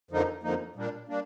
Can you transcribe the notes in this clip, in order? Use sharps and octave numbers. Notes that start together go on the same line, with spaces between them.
F2 D3 F3 A#3 D#4
F2 D3 F3 A#3 D#4
A#2 G3 A#3 D4
G3 A#3 D4